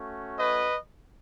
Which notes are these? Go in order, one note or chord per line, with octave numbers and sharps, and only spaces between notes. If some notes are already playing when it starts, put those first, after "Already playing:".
Already playing: A3 C#4 F#4
B4 D#5